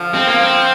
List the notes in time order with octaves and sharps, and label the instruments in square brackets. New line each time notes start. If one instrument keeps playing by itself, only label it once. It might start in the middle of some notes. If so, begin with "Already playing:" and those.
Already playing: [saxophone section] D3 F3
[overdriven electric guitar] C4
A#3
C4